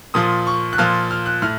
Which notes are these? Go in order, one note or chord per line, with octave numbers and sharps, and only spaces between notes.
A#2 F3 D#6
C#6
F#6
A#2 F3 F6
F6
F#6
A2 F6